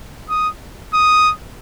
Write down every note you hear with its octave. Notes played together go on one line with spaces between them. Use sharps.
D#6
D#6